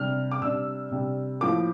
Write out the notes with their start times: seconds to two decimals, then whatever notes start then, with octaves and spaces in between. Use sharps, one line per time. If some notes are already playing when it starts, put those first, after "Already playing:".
Already playing: C3 G3 D4 F6
0.32 D6
0.42 C3 G3 D4 E6
0.91 C3 G3 D4
1.41 A2 F3 A#3 D6